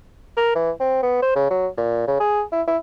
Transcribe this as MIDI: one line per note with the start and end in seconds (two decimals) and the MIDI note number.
0.37 0.51 70
0.55 0.71 52
0.80 0.98 60
1.03 1.19 59
1.22 1.34 72
1.35 1.47 49
1.50 1.67 54
1.77 2.07 46
2.07 2.15 49
2.20 2.43 68
2.52 2.62 64
2.67 2.77 64